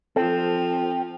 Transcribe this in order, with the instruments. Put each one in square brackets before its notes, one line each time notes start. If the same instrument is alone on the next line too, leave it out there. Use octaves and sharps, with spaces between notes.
[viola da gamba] F3 [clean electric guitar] C4 [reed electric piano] A4